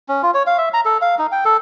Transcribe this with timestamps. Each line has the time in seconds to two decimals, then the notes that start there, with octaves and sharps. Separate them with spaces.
0.09 C#4
0.23 F4
0.34 C#5
0.47 F5
0.58 E5
0.74 A#5
0.85 A4
1.01 F5
1.19 D#4
1.32 G5
1.45 A4